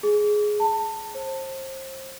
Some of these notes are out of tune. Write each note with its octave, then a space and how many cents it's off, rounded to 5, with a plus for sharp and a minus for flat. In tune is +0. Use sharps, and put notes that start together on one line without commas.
G#4 +10
A5 +25
C5 +25